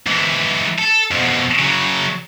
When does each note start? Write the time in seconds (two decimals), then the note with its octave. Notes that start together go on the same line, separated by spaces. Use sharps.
0.07 G#2 E3
0.79 A4
1.11 F2 B2
1.59 C#3 F#3